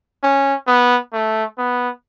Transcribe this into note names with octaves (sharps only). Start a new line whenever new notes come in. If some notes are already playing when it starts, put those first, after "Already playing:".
C#4
B3
A3
B3